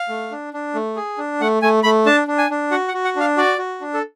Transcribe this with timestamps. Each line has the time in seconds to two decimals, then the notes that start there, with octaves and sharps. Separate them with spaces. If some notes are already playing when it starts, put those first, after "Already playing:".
Already playing: F5
0.09 A3
0.31 D4
0.54 D4
0.74 A3
0.96 G#4
1.18 D4
1.41 A3 F#5
1.62 A3 G#5
1.83 A3 B5
2.06 D4 A5
2.28 D4
2.38 G#5
2.50 D4
2.71 F#4 F#5
2.88 F#5
2.94 F#4
3.05 F#5
3.16 D4 F5
3.37 F#4 D5
3.58 F#4
3.81 D4
3.94 A4